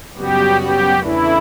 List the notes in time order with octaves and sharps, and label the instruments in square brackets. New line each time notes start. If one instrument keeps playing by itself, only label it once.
[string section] F#2 C#3 G3 B3 F#4 [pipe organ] G4
[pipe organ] G4
[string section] E2 C#3 E3 A3 D4 [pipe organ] E4